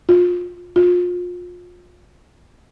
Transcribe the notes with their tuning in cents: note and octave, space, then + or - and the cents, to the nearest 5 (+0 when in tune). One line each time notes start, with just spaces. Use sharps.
F4 +25
F4 +30